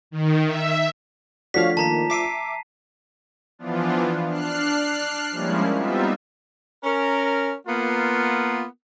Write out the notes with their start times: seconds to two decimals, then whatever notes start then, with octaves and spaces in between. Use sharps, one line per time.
0.11 D#3
0.45 E5
1.54 F3 A3 D4 F#4 C#5 F5 B6
1.77 D#3 A#3 A5 A#5 B6
2.10 E5 D6 B6 C7 D#7
3.59 E3 F3 B3 D4 F4
4.28 D4 F6 F#6 C7
5.31 F3 G3 G#3 A#3 C#4 E4
5.76 G3 B3 C4 D#4 F4 E5
6.84 C#4 A#4
7.67 A#3 B3 F4